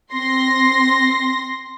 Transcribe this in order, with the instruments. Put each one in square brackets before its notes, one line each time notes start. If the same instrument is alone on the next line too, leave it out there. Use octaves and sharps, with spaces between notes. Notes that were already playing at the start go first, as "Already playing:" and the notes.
[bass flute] C4 [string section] C6 A#6